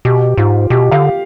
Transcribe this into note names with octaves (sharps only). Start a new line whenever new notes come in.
B2 G4
G#2 F4
B2 G4
D3 F5